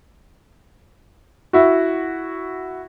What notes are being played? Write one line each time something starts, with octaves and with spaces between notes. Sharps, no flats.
E4 F#4